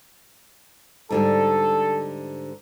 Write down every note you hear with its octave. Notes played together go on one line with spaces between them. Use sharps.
G#2 D3 G3 A4